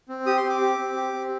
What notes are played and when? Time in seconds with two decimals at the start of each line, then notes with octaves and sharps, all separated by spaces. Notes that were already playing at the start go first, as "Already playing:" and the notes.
0.09 C4
0.26 G4 D#6
0.37 C6
0.44 C4
0.50 D6
0.61 G4
0.78 C4
0.96 G4
1.13 C4